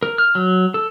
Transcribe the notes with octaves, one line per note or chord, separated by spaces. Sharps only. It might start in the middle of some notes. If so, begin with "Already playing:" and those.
A#4
F6
F#3
A4